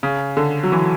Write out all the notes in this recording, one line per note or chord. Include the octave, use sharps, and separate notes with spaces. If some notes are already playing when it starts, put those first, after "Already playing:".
C#3
D3
F#3
E3